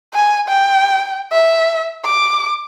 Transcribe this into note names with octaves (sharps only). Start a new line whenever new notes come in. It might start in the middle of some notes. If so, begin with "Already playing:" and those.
G#5
G5
E5
D6